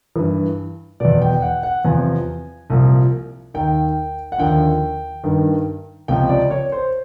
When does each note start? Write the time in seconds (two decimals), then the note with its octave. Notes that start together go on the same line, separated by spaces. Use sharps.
0.16 G2 E3
1.00 E2 B2 D5
1.22 G5
1.42 F#5
1.63 F#5
1.85 E2 C3 F3 G#5
2.70 C2 A#2 F3
3.54 D#2 D#3 G5
4.32 F#5
4.38 D#2 D3 F3 G5
5.24 G2 D#3
6.08 C#2 C3 F3 G5
6.29 D5
6.51 C#5
6.72 C5